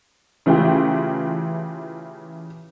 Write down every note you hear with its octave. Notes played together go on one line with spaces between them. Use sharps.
C#3 E3 A3 E4 F4 G4